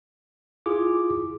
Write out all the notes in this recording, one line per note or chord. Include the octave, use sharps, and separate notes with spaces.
E4 F4 G#4 D6